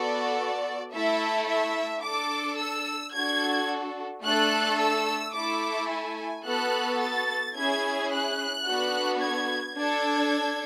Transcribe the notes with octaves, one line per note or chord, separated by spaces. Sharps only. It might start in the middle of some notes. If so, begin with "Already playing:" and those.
Already playing: B3 F#4 A4 D5
A3 E4 A4 E5
E5
D4 A4 D6
E6
D4 F#4 A4 G#6
A3 D4 A4 F#6
E6
A3 E4 A4 D6
G#5
B3 F#4 A4 F#6
A6
C#4 E4 G#4 G#6
F#6
B3 D4 F#4 A4
G#6
D4 A4 G#6